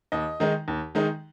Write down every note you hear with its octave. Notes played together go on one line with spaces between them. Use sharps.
D#2 D#5
D#3 G#3 D#4
D#2
D#3 G#3 D#4